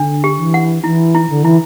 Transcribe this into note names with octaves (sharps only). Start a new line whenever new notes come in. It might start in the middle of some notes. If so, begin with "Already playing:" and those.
Already playing: D3 D4
G4
E3
F#5
E3 E4
E4
D3
E3 E4